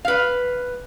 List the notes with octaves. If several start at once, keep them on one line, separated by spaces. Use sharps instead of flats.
B4 F5